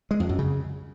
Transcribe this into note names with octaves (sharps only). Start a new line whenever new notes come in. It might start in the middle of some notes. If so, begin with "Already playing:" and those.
G#3
F2
F#2
C#3